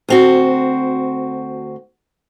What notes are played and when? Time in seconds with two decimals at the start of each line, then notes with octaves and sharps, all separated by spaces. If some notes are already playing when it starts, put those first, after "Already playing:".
0.09 D2 C4 F#4